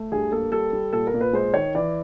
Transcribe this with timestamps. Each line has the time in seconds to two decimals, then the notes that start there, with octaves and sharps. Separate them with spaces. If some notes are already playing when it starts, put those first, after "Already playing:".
Already playing: A3
0.12 G2 G#4
0.32 A#3 A4
0.52 G3 A4
0.73 G3
0.93 A#2 A4
1.07 A#4
1.14 A#2
1.21 B4
1.33 G#3 C5
1.54 D#3 C#5
1.75 E3 D5